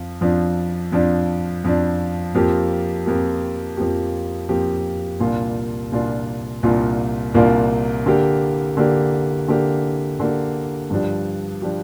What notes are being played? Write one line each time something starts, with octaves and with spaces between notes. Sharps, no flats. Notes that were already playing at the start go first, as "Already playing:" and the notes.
Already playing: F2 F3
F2 F3 D4
F2 F3 D4
F2 F3 D4
F2 F3 A#3 G4
F2 F3 A#3 G4
F2 F3 A#3 G4
F2 F3 A#3 G4
C2 A#2 A#3 D4 F4
C2 A#2 A#3 D4 F4
C2 A#2 A#3 D4 F4
C2 A#2 A#3 D4 F4
D3 A#3 G4
D3 A#3 G4
D3 A#3 G4
D3 A#3 G4
G2 F3 D4 G4
F3 D4 G4